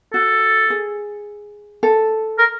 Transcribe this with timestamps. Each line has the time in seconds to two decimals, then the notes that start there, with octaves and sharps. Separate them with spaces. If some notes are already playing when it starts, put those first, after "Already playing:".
0.13 F#4 A4
0.70 G#4
1.83 A4
2.39 A#4